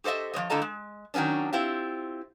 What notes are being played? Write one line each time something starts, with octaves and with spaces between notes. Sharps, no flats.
G4 A4 C5 D#5 E5
F3 G#3 C#5 D#5
A2 D3 F4 A4 D#5 A#5
G#3
D#3 F#3 B3 C#4 D4
C4 E4 F4 G4